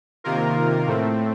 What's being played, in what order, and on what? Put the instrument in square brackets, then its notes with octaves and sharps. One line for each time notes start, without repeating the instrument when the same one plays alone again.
[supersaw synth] C3 D#3 A#3 F4 A#4
A2 A3 C4